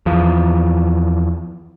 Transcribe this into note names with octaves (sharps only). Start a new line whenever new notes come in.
E2 F3